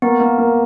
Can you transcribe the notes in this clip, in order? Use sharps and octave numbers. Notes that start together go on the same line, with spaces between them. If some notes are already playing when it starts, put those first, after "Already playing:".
A#3 B3
A#3
A#3